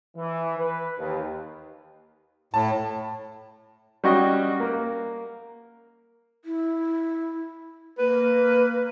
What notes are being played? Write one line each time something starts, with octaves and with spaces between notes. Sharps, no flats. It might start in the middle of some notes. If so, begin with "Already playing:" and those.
E3
B4
D#2
A2 A5
G3 C#4 F#4 D#5 G5
A#3
E4
A#3 B4